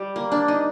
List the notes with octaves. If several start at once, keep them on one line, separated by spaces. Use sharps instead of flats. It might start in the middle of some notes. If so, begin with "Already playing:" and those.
Already playing: G3
A#3
D4
D#4